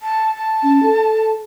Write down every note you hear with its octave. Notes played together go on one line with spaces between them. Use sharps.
A5
A5
C#4
A4